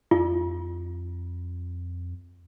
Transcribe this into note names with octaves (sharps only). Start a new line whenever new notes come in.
F2 F4